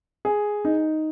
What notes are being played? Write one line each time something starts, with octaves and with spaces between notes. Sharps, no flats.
G#4
D#4